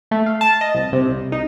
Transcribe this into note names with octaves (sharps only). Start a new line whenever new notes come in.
A3
F5
A5
D#5
C2
C3
C2
D#4